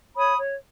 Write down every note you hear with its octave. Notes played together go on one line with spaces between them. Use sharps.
C#5 B5 D#6
C#5